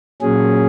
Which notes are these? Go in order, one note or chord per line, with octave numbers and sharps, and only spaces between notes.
A#2 F#3 C#4 G#4